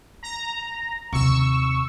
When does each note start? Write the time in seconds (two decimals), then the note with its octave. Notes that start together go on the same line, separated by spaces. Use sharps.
0.23 A#5
1.13 D#2 C3 C#6 E6